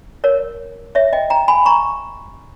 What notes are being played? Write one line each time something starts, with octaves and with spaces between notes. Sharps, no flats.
A#4 C#5
C#5 E5
D#5 G5
G5 A#5
G#5 B5
A#5 C#6